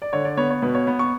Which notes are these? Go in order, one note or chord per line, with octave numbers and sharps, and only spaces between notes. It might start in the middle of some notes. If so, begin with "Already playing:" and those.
D5
D3 C#5
D5
B3 C#5
C#5
B2 B4
C#5
B3
C#6